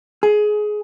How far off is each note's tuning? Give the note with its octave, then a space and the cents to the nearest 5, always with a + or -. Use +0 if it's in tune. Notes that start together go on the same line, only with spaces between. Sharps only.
G#4 +20